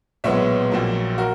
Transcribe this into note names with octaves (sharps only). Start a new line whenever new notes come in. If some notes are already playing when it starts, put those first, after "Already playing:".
B1 A#2 G#3 B3 C#5 E5
A#1 A#2 F#3 A#3
F#4 A#4